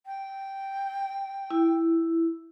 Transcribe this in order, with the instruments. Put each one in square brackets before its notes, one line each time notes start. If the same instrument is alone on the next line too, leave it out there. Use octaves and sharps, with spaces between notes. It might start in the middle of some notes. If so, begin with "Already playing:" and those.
[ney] G5
[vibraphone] E4